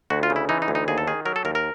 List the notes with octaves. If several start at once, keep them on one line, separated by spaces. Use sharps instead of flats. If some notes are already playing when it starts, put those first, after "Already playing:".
D2 F#4
F4
C#3
E4
E3 D#4
D#4
D2
D#4
D#2 G#4
A4
D#3 G#4
F#3 A#4
A4
D#2 A#4
A#4